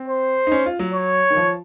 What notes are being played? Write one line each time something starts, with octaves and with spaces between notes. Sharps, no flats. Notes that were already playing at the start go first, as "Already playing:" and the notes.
Already playing: C4
C5
D#4
C#4
F4
F#3
C#5
D#3
F3